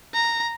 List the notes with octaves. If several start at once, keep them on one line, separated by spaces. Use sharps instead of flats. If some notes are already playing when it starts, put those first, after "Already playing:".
A#5